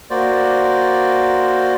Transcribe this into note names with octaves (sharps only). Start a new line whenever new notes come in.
A#3 F#4 C5 D5